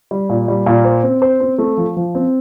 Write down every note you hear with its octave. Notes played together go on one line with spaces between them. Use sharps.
G3
A#2
G3
A#2
C5
C4
C5
C4
A3
F3
F3
C4